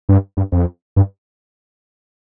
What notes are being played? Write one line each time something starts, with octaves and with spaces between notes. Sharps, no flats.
G2
G2
F2
G2